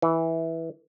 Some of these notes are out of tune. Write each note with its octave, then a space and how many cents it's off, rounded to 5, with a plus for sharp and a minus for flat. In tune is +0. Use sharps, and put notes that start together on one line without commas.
E3 -10